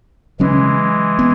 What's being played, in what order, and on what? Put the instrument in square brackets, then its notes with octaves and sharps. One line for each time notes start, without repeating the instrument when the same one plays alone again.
[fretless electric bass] C#3 F#3 C#4 [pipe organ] E3 G#3
[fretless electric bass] B3